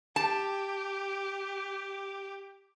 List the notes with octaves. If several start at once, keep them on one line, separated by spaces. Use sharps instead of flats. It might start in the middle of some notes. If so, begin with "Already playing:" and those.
G4 A5